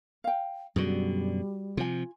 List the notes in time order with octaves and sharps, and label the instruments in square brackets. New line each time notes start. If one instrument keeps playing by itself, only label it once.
[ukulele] F5 G5
[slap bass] F#2 B2 D3 [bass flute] G3 [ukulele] F#4 G#4
[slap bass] C3 F3 [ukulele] F4 G#5